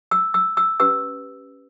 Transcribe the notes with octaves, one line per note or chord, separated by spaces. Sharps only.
E6
E6
E6
C#4 G4 B4 E6